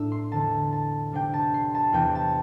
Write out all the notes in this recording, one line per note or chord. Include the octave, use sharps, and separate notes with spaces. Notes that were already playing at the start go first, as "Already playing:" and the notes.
Already playing: A2 A3 D4 E6
C6
E2 D3 A3 C4 A5
A5
C3 G3 D4 G5
A5
C6
A5
E2 C3 E3 C4 G5
A5